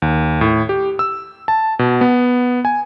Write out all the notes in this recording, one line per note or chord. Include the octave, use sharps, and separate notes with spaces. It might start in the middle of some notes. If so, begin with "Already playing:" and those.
D#2
A2
G4
E6
A5
B2
B3
G#5